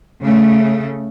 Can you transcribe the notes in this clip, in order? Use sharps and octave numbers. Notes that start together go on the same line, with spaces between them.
C#3 A3